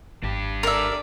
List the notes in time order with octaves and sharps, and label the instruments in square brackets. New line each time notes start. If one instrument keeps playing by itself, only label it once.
[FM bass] G#1 [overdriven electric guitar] D4 G4
[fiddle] A4 D5 [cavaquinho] A#4 E5